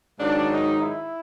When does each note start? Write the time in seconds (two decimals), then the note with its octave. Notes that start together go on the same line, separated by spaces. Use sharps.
0.18 G#2 D#3 F#3 D4
0.49 D#4
0.78 E4